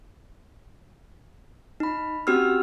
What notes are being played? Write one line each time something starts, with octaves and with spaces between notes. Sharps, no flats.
D#4 B5
C4 C#4 F#4 G4 E6 F6